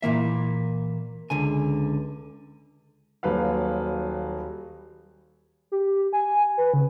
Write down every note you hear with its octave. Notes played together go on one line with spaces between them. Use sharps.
A#2 E3 A#3 E5
C#2 D3 G#5
D#1 F#3 B4 F5
G4
G#5
B4
C#3